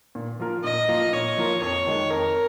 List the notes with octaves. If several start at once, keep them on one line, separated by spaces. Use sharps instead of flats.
A#2
F3 A#3 F4 A#4
A#2 D#5
F3 A#3 F4 A#4
A#2 C#5
F3 A#3 F4 A#4
F2 C#5
D#3 G#3 D#4
F2 A#4